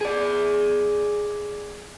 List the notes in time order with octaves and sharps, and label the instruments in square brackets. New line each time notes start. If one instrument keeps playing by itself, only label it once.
[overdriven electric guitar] G#4 D5